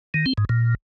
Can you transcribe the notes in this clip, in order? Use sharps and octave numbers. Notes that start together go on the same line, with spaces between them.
D#3
C4
G#2
A#2